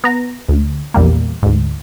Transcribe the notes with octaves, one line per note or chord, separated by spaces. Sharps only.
B3 A#5
D2
A#1 E2 G3 A#3
D2 G#2